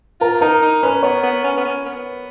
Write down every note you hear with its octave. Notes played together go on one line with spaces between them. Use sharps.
F4 A#4
D#4 A#4
D#4
C#4 B4
B3 C#5
B3
C#4
B3
C#4
B3